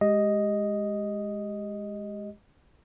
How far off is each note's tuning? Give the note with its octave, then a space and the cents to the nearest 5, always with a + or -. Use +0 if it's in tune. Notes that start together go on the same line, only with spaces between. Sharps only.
G#3 +0 G4 +0 D#5 +0